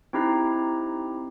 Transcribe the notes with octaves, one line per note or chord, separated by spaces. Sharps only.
C4 D#4 E4 G4 A#5